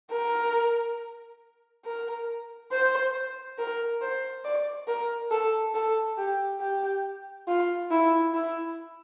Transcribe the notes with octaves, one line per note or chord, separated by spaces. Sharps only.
A#4
A#4
C5
A#4
C5
D5
A#4
A4
A4
G4
G4
F4
E4
E4